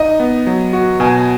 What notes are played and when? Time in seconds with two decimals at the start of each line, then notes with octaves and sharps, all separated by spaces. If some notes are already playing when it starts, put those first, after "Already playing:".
Already playing: D#4 D#5
0.20 B3
0.47 F#3
0.73 F#4
1.00 B2 G#5